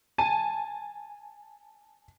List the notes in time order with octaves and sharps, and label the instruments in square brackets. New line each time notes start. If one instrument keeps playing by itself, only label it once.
[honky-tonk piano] G#5 A5 D#7